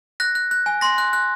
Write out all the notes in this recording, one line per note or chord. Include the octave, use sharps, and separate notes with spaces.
F#6 A#6
F#6
F#6
G#5
C6 A#6
F#6
F#6